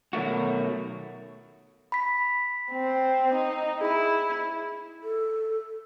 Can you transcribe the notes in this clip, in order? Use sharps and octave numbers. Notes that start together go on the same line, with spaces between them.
B2 D#3 F#3 A3 F#4
B5 B6
C4
D#4
E4 G#4 B5
A4